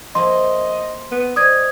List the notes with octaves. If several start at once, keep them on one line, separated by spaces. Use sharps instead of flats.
F3 A#3 E4 D#5 C6
B3
C5 D5 D#5 G#5 D#6 G#6